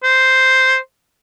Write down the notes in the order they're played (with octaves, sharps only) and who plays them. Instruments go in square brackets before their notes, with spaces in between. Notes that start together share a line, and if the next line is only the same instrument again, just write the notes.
[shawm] C5